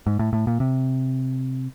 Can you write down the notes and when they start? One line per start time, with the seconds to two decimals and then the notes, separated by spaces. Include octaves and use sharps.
0.07 G#2
0.19 A2
0.33 A2
0.47 A#2
0.60 C3